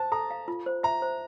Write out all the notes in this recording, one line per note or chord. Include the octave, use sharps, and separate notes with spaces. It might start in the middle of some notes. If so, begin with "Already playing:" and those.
Already playing: C5 A5
A4 A#5
F5
F4
C5
E5 A#5
C5